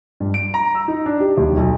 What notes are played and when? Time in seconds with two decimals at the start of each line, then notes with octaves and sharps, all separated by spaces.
0.20 G2
0.34 D7
0.54 A#5
0.75 E6
0.88 D#4
1.06 D4
1.20 G4
1.38 D#2
1.57 B1